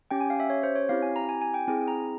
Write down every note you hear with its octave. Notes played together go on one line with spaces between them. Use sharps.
C#4 G4 G5
G#5
F5
E5
C#5
C5
C#5
C4 E4 G4 F5
G#5
A#5
G#5
G#5
G5
C4 E4 G#4 G#5
A#5